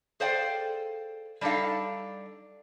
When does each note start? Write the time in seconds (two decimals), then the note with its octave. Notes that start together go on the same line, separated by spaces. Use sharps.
0.20 G#4 A4 C5 D5 F5 G5
1.41 G3 D4 D#4 F4 A4 F5